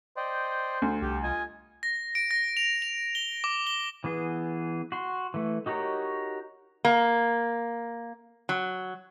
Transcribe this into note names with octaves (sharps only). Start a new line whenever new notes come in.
C5 D5 D#5 G5
D2
C2 G4
F4 D#5 G#5
A#6
D7
A#6
F7
F7
G7
D6
G7
E3 B3 G#4
F#4 C6
E3 A3
D#4 F#4 G4 A#4 C#5
A#3
F#3